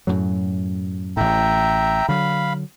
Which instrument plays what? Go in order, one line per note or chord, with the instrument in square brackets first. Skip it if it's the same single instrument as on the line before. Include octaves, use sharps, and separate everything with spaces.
[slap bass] F#2 A2 F#3
[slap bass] A1 A2 [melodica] E5 G5 A#5
[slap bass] D3 F#3 [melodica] F5 B5